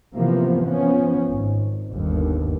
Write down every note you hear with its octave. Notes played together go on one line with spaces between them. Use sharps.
C3 E3 F3 A#3 B3
F3 B3 C#4
G#1
G1 D#2